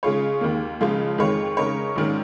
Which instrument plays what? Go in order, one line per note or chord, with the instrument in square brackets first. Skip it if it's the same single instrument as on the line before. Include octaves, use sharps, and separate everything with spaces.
[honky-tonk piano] C#3 G#3 F4 G#4 C#5
D#2 D#3 A#3
C#2 C#3 F3 G#3 F4
F2 D#3 G#3 F4 C#5
C#3 G#3 D#4 A#4 C#5
A#1 G#2 D#3 C#4 A#4